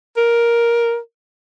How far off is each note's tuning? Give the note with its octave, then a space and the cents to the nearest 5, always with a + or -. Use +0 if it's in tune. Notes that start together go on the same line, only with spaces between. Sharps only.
A#4 +10